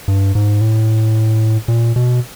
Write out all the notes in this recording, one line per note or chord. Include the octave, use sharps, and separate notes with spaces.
G2
G#2
A2
A#2
B2